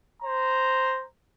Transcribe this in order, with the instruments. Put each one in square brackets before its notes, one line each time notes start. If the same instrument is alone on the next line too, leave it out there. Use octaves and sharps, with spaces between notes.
[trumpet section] C5 A#5